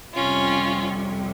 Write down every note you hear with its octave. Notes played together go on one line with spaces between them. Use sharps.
F2 C3 G3 C#4 F4